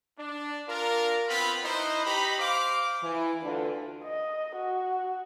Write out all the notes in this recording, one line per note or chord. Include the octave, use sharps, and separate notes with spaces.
D4
D4 F4 A#4
B3 C4 F4 B5
D#4 E4 B4 C5 D#5
D#4 G4 A#5 B5
C5 F5 D6
E3
D2 D3 D4 F4 B4
D#5
F#4